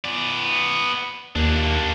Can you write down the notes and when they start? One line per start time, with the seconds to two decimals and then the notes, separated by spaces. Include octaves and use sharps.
0.04 B3 D5
1.36 D#2 A#3 D4